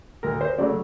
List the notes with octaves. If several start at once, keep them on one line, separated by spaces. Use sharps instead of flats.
D2 A#4
C5
C#3 F#3 A3 D5